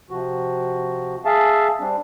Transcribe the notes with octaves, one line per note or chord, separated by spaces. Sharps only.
C3 F3 F#4
G#4 E5 F5 A5
G3 C4 D4